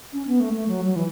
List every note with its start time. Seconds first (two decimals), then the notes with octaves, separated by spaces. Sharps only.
0.13 C#4
0.27 B3
0.40 A3
0.55 A3
0.68 F#3
0.87 F#3
0.96 E3